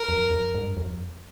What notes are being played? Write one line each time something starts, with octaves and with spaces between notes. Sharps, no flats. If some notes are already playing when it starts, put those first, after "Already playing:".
Already playing: A#4
F2
F2
G2
F2